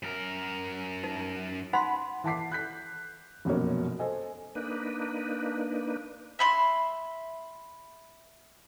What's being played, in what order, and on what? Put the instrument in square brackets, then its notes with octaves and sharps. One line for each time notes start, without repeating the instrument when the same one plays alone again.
[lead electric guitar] F#2 A#4
[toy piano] D#4
[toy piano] D#4 C6 [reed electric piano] F#5 B5
[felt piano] E3 F#5 A5 D6 B6 C7
F#6 G6 B6
F1 F#2 B2 F#3 A#3 C#5
A4 C5 D#5 G#5
[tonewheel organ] A#3 D4 D#4 B4
[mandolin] E5 B5 C6